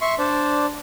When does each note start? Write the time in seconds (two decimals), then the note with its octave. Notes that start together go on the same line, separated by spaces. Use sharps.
0.01 E5 C6 C#6
0.19 D4 C5 D5